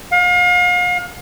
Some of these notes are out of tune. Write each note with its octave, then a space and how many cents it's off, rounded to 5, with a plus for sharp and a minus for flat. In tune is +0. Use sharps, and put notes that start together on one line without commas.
F5 +40